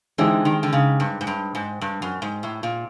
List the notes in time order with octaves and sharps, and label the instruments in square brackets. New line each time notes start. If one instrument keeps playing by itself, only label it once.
[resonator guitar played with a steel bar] D3 E3 [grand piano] G#3 C4 D#4 G4
[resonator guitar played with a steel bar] D#3
D3
C#3
G2
G#2
G2
G#2
G2
F#2
G#2
A2
A#2